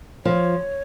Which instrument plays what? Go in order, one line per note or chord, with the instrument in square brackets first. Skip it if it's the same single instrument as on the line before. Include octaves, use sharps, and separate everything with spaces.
[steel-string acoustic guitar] F3 [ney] C#5